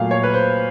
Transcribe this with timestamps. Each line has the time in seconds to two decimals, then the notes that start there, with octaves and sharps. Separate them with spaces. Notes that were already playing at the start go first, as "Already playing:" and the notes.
Already playing: A#2 F#3 A3 F5
0.11 C#5
0.23 B4
0.34 C5